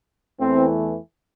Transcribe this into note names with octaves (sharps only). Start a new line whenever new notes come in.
E2 E3 A3 C4